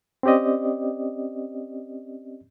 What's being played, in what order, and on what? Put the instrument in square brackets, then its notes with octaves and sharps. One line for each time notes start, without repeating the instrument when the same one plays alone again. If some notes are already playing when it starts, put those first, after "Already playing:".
[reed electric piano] C4 C#4 G4 D5 D#5